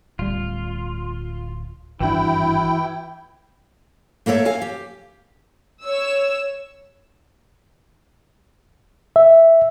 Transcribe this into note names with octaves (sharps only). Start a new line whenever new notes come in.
D1 G3 F4
G#1 G2 E3 D4 E4 F#4 G5
A3 A#3 A4 C#5 E5
F#4 C#5 F5 G#5
G4
C#5 E6
E5